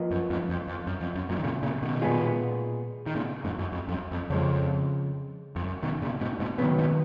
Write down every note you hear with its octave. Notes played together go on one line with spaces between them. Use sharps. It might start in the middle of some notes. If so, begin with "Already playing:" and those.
Already playing: F3 A#3 F4 B4 D#5
F#2
F2 G#2
F2
F2
F#2
F2
F#2
F#2 A#2
D#3
A#2 C#3
A#2 C#3
B2 D#3
A#2 G#3 B3 F4 G#4
D#3
A#2 C#3
F2 G#2
F#2
F2
F2
F#2
F2
F2 C#3 F3 G#3
F2
F#2
B2 D#3
A#2 C#3
G#2 B2
G#2 B2
A#2 C#3 D#3 F#3 B3
G#2 B2